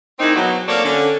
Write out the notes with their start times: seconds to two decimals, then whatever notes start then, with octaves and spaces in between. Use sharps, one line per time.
0.20 D#3 G#3 A#3 C4 D#4 E4
0.36 B2 F#3
0.67 A#3 C4 A4 C#5 D5 F5
0.84 D3 C#4